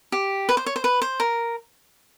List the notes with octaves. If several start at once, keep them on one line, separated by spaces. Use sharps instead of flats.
G4
B4
C5
C#5
C5
B4
C5
A#4